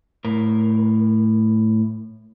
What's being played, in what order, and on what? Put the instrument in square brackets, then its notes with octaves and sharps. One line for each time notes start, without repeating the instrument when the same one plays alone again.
[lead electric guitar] A2 A#4